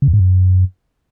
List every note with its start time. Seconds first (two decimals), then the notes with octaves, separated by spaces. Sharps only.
0.02 C#3
0.08 E2
0.14 G#2
0.19 F#2